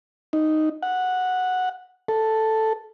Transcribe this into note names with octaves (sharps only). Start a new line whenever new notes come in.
D#4
F#5
A4